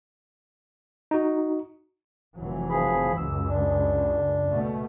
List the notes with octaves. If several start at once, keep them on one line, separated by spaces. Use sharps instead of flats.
D#4 F#4
F1 E3 F#3
F3 G#4 B5
C#2 F#2 E6
D4
B2 A3 B3